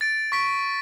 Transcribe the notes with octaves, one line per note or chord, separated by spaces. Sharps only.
A6 D7
C#6 B6 D7